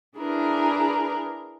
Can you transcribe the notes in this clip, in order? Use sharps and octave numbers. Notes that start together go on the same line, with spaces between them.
D4 E4 G#4 A#4 B4